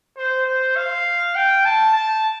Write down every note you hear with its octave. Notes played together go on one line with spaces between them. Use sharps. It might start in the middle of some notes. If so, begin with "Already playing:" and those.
C5
C5
F5
G5
A5
A5